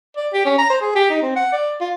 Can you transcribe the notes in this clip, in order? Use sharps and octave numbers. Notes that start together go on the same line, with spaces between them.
D5
G4
C#4
A#5
C5
G#4
G4
D#4
C4
F#5
D5
F4